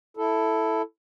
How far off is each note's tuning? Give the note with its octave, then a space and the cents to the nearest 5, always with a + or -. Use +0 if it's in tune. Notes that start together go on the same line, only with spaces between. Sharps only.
E4 +0 A4 +0